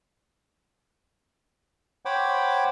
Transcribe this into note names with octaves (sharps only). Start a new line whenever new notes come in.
C5 C#5 F#5 G5 B5 D6